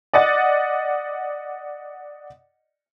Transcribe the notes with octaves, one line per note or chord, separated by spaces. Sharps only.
D5 D#5 F#5 A6